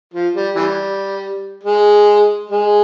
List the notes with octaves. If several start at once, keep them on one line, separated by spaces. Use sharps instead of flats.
F3
G3
E3 G3
G#3
G#3